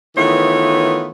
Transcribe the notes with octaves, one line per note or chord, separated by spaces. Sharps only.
D#3 E3 A3 B3 F4 C#5